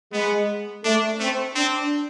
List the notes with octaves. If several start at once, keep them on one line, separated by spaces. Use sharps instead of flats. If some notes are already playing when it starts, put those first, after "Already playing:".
G#3 B3
A3 D4
A3 C4
C4 D4